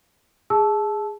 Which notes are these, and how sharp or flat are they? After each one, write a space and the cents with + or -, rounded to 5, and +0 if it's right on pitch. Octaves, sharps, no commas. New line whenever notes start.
G#4 -10 A5 -20 E6 +0